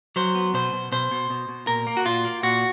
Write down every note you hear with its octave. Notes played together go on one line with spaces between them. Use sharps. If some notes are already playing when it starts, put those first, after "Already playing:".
F#3 C5
B3
B2 C5
B2
B2 C5
B2
B2
B2
A#2 A#4
A#3
F#4
A#2 F4
A#3
A#2 F#4